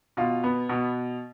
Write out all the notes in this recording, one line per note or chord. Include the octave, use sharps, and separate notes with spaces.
B2 F4
B3
B2